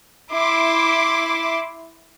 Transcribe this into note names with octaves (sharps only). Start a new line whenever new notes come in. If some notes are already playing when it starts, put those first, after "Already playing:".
E4 C6 D6